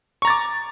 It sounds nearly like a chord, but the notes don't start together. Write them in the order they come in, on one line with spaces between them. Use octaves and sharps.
C#6 A#5 A6 D6